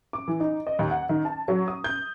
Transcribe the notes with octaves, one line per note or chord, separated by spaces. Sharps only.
D6
E3
D#4
D#5
D#2
F#5
D#3
A5
F#3
D#6
G6